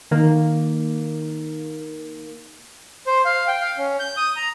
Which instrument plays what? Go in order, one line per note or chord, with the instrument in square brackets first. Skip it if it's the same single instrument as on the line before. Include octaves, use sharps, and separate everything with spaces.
[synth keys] D#3 A#3
[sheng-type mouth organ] C5
F5
G5
F5
C#4
G6
D#6
A#5